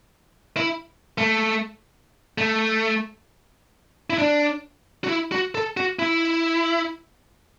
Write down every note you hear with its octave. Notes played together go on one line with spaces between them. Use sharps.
E4
A3
A3
E4
D4
F#4
E4
F#4
A4
F#4
E4